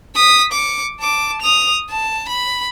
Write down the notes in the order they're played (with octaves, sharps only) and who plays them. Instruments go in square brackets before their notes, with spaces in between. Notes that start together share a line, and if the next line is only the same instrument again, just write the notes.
[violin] D#6 B6
D6 C#7
A5 D6
D#6 F7
A5
B5